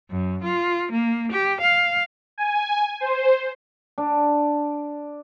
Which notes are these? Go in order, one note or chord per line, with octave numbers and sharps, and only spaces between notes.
F#2
F4
A#3
G4
F5
G#5
C5
D4